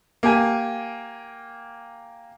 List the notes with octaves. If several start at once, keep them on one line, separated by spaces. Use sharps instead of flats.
A#3 G4 G#5